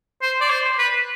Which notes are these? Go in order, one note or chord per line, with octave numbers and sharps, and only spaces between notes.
C5
D5
C5
B4